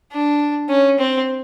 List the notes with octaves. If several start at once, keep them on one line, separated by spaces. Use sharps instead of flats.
D4
C#4
C4